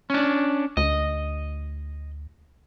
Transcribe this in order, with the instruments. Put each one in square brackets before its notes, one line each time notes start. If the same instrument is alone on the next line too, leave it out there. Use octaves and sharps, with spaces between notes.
[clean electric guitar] C#4 D4
[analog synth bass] D2 [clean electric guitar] D#5